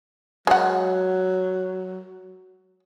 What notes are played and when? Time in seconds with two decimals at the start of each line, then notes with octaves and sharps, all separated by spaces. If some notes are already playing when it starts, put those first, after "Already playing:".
0.47 F#3 G#3 F#5